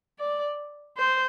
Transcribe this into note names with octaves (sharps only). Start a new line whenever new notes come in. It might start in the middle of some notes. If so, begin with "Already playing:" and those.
D5
C5